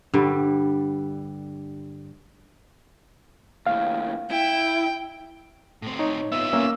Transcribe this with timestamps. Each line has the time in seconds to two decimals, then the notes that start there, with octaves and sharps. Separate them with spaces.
0.14 G2 D3 G3
3.66 D#2 A2 F5
4.31 E4 G5
5.82 A2 C4
5.99 D#4 C#5
6.32 B3 F4 E5
6.53 A#3 C#4